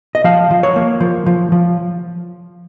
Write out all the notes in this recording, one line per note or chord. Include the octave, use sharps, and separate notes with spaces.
D#5
F3 F5
F3
C#5
A#3
F3
F3
F3